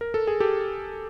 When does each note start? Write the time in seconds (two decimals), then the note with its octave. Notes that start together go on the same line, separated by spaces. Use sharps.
0.01 A#4
0.14 A4
0.27 G#4
0.40 G4 A4